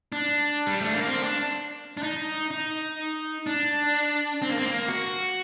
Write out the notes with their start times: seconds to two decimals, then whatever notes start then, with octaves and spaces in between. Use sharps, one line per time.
0.12 D4
0.67 G3
0.81 A3
0.95 A#3
1.07 C4
1.23 D4
1.97 D4
2.03 D#4
2.51 D#4
3.47 D4
4.42 C4
4.49 A#3
4.57 C4
4.65 A#3
4.88 F#4